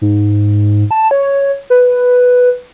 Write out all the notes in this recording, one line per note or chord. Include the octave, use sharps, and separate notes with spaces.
G#2
A5
C#5
B4